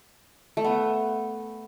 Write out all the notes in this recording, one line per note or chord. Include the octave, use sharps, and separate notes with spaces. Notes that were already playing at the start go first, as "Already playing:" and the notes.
A3
B3